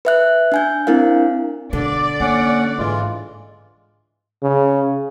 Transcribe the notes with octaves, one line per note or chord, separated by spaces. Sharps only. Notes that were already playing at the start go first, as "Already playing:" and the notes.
B4 E5 F#6
D4 G#5 G6
C4 D4 E4 A#4 F5
B2 D3 D5
A#3 C#4 F#5
G#2 E3 G#3 F4
C#3